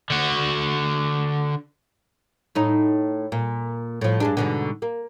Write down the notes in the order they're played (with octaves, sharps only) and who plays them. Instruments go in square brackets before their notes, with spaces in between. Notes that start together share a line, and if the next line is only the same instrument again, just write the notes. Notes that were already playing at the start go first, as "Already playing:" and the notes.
[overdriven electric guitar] D3 F#4
[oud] A2 D#4
A#2
A2 F3
G2 G#3 D4
G#2 B2 D3
A#3